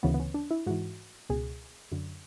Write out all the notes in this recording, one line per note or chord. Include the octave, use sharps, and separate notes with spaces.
D2 C#3 E3 B3
B3
C#4
D4
E4
G#2 E3 F#4
C#2 B2 G#4
F#2 D3